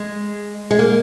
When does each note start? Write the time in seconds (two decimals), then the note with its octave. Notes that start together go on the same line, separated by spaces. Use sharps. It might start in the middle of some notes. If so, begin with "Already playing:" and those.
Already playing: G#3
0.71 G#3
0.79 A#3